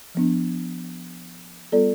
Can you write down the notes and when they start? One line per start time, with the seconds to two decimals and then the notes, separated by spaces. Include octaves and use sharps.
0.15 F3 B3 D4
1.72 G3 B3 F4 A4 D5